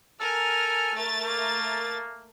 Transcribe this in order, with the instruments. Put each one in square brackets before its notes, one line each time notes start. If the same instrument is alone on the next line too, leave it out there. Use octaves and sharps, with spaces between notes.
[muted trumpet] A4 [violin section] A#4 G#5 F6
[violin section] A3 A#4 A6
[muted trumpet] A#3